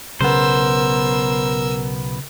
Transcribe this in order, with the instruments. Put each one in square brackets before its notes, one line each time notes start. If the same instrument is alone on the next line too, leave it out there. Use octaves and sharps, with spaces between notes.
[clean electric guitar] B1 B3 [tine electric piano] C#3 [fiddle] A#4 E6 [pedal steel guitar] C5